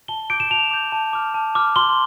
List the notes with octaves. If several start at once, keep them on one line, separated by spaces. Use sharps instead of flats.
A5 G7
D6 G6 D7
E7
A5 F7
D6 G6
A5
D6 F6
A5
D6 F6
C6 G7